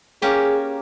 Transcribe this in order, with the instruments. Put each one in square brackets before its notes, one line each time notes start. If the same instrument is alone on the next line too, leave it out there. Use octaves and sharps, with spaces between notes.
[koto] A#3 C#4 G4 [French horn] G#4